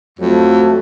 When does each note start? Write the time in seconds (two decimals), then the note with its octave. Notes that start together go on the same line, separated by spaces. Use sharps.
0.19 F2 F#3 A3